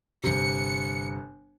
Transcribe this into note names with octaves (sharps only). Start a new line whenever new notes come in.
G1 C3 C#7